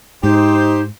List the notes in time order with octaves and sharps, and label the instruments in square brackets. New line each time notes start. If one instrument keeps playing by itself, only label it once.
[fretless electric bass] G#2 [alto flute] D#4 [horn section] G4 C5